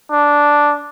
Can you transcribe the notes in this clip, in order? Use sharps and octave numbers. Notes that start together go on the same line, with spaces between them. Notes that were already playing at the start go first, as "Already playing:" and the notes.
D4